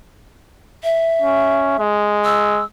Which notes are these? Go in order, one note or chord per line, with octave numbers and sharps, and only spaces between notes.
E5
C#4
G#3
E6